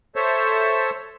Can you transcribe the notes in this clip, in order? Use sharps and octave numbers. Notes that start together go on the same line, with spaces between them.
A4 C5 C#5 E5